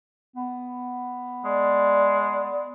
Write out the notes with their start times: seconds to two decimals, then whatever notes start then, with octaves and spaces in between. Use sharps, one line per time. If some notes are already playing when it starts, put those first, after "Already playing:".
0.36 B3
1.45 G#3 D5